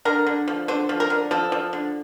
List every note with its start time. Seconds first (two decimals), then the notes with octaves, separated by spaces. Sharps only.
0.05 D3 A#4
0.27 D3
0.48 F3
0.68 D3 C5
0.89 F3
1.00 A#4
1.10 D3
1.31 F3 A4
1.52 F3
1.73 D3